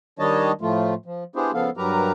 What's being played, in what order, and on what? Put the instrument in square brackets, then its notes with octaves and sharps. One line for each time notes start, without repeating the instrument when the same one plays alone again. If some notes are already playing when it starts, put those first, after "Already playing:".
[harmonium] D#3 G3 D4 C#5 D#5 A5
A2 F3 A3 F4
F3
B3 D4 E4 G4 G#4 C5
C#3 F3 B3 A4 F5
G2 F#3 G4 A#4 B4 A#5